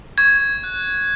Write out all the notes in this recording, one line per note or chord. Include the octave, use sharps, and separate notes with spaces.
C#6 G#6
F#6